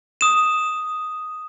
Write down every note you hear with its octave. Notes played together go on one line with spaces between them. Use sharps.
D#6 E7